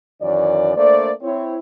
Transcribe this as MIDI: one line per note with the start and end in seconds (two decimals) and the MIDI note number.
0.22 0.73 42
0.22 0.73 51
0.22 0.73 52
0.22 0.73 73
0.22 0.73 74
0.77 1.12 57
0.77 1.12 58
0.77 1.12 62
0.77 1.12 72
0.77 1.12 74
1.22 1.59 60
1.22 1.59 64
1.22 1.59 73